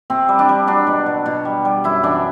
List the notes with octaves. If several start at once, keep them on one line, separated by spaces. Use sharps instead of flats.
C3 C4
G3
D4
G3
F#3 D4
B2
B2
B2
G3
G3
F#2 E4
E3 D4